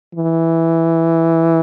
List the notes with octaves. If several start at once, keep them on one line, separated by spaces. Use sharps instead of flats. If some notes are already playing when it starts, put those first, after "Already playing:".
E3